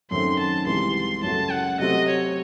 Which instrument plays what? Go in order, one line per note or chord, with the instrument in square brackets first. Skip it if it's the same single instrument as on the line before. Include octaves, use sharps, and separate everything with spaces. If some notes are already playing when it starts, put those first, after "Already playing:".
[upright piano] F#2 D#3 A3 C4 [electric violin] C6
[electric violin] A5
[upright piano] C2 C3 E3 G#3 [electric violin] C6
[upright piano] F#2 C#3 F#3 A3 [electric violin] A5
[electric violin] F#5
[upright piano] C3 F#3 A3 C4 [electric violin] D#5
[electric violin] C#5